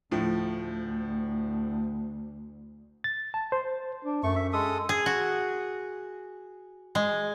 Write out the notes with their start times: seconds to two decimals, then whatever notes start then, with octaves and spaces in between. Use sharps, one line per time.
0.11 D2 A2 F3
3.04 A6
3.34 A5
3.52 C5
4.04 D4
4.23 F#2 A3 C#6
4.36 E5
4.53 G#3 A4 D#6
4.89 G#4
5.06 F#4
6.95 G#3